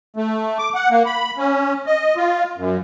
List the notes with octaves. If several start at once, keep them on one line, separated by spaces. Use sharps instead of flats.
A3
D6
F#5
A#3
B5
C#4
D#5
F4
F#2